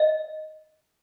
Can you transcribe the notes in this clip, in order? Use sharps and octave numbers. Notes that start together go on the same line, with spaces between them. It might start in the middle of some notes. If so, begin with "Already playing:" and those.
Already playing: D#5